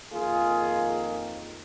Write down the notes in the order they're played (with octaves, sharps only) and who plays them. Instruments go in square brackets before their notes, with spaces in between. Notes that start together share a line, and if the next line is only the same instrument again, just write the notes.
[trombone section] F2 D#3 A#3 F4 G#4